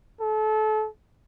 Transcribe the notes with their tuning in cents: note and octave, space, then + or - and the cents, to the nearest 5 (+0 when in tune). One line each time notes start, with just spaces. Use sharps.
A4 -30